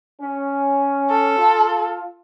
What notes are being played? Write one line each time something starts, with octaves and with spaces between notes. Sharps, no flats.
C#4
A4
F4